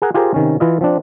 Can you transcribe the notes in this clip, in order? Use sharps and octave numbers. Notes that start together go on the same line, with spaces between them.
G#4 A#4 F#5
F4 G4 G#4 A#4 C5
C3 D#3 C#4
E3 E4 F4 D#5
F3 C4 D4